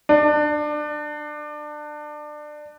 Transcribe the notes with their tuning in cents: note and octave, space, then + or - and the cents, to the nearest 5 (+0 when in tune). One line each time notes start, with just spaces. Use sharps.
D4 +25